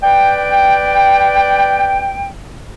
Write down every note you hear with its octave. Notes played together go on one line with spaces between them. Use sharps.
B4 D5 G5